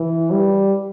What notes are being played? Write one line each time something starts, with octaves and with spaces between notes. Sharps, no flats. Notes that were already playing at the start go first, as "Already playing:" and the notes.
Already playing: E3
G3